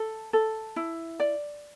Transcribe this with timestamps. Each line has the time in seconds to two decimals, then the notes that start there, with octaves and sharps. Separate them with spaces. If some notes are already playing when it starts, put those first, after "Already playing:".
Already playing: A4
0.33 A4
0.76 E4
1.20 D5